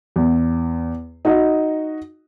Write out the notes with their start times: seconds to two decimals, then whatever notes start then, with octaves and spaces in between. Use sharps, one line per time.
0.16 E2
1.25 D#4 F#4 D#5